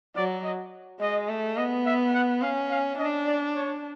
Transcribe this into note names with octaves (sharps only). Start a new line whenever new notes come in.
F#3 D5
D#5
G#3 D#5
A3
B3 D#5
E5
F#5
C#4 F5
F5
D4 D#5
D5
C#5